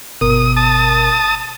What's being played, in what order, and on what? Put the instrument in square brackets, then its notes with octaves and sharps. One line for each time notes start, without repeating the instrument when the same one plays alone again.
[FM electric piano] G1 B2 A#4 [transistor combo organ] D#6
[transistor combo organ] A5 D#6